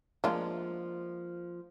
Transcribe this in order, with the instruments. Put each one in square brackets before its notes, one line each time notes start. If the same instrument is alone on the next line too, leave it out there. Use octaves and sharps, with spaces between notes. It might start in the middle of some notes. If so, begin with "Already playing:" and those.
[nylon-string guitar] F3 A#3 [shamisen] G#3 D4 F4